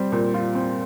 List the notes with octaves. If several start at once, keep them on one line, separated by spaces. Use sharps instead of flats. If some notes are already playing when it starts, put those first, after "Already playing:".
Already playing: G3 C4
A#2
F4
C4